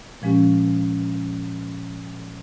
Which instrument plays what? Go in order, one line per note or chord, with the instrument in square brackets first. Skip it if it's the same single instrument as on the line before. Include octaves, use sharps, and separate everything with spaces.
[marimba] A#2 F3 G#3 C#4 G4